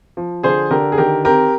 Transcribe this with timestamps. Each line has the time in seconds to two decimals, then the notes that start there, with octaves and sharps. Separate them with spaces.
0.17 F3
0.43 D3 G#4 C5
0.71 D3 G4 A#4
0.92 G#4
0.98 D#3 G4 A#4
1.25 C4 G4 A#4